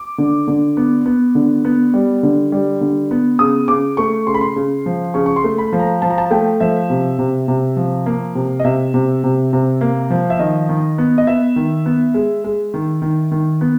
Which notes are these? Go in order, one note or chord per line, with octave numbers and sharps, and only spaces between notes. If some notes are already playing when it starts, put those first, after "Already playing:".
Already playing: D6
D3
D3
B3
B3
D3
B3
G3
D3
G3
D3
B3
C#3 D#6
C#3 D6
A3 C#6
C#3 C6
B5
C6
C#3
F3
C#3 C#6
C#6
C6
A3
B5
F3
A#5
F3 A5
A#5
A5
A3 G5
F3 E5
C3
C3
C3
F3
A#3
C3
D#5
C3 E5
C3
C3
C3
A#3
F3
E5
D#3 D#5
D#3
B3
D#5
B3 E5
D#3
B3
G#3
G#3
D#3
D#3
D#3
B3